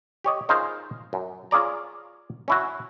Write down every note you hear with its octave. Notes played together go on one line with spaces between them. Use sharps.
G4 C#5 D#5
C#4 D#4 F4 G#4 A#4 C5
F#2
C#4 F4 G#4 D5 A#5
C#4 E4 F#4